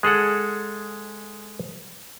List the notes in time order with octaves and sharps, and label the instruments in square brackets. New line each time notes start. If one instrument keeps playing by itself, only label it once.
[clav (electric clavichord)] G#3 G#4 A4 F#5